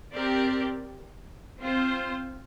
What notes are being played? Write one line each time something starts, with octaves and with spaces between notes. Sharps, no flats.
C4 G4 A#4 D5
C4 F4 C5